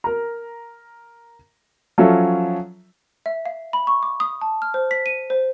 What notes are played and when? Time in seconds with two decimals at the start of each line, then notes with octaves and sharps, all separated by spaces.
0.04 A#4 A#5
1.98 F3 F#3 C#4 F4 A4 E5
3.26 E5
3.46 F5
3.73 B5
3.87 C#6
4.03 D6
4.20 D#6
4.41 A5
4.62 F6
4.74 C5
4.91 B6
5.06 D#7
5.30 C5